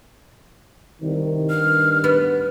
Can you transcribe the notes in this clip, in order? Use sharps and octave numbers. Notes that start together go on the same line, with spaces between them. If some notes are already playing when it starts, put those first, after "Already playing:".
C2 D#3
G2 F6
B3